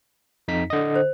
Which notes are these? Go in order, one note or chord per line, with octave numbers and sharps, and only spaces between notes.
F2 D#4 B6
D3 D#5
C5